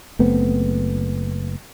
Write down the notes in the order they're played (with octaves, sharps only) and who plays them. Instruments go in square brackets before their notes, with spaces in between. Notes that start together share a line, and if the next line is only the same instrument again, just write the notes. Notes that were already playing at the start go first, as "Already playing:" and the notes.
[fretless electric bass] F#1 A3 B3 C4